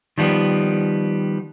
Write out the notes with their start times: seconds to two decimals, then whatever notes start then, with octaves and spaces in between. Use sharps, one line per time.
0.18 D#3 F3 G3 B3